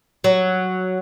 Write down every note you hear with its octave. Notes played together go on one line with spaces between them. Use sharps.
F#3